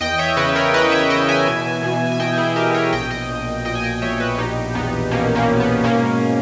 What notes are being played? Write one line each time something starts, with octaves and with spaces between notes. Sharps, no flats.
E2 D#5 G5
C#5 E5
C#3 B4 D#5
A#4 C#5
E3 B4 D#5
C#5 E5
E3 D#5 G5
E5 G#5
B2
B2
G#5
B2 D#5 G5
E4 G#4
B2 G4 A#4
A#4 C#5
A#1 D#5 G5
D#5 G5
A#2
A#2 D#5 G5
G#5
D#5 G5
A#1 C#5 E5
B4 D#5
B2 D#4 G4
E2 B3 D#4
B2 A#3 C#4
A#3 C#4
B2
B3
G#2 A#3 C#4